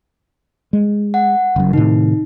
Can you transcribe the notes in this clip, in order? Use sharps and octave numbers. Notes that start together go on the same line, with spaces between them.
G#3
F#5
F#1 F#2
A2 C3 D#3 D#4